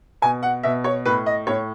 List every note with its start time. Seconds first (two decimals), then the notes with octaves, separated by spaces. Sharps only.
0.22 B2 G#5
0.43 F#5
0.63 B2 E5
0.84 C#5
1.05 A2 B4
1.26 D#5
1.47 A2 C#5